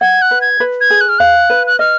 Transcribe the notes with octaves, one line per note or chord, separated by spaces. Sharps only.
F#5 G#6
F#6
B4
G#6
B4
G#6
G#4
F#6
F6
F5 F#6
B4
F#6
D#5 F6